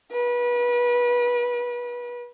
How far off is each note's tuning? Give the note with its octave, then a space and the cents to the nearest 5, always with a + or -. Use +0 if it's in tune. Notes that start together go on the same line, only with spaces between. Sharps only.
B4 -30